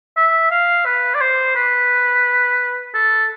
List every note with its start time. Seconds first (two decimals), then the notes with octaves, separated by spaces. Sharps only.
0.16 E5
0.51 F5
0.85 B4
1.15 D5
1.21 C5
1.55 B4
2.94 A4